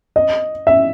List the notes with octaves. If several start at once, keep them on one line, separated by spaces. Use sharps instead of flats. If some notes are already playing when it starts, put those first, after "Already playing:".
D#5
E5